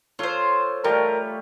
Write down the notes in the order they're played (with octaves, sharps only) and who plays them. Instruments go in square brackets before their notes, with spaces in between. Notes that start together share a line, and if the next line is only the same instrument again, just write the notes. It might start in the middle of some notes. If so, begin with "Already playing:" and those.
[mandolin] F4 C5 [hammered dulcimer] A4 C#5
[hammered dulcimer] G3 A3 [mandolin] F4 [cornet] A#4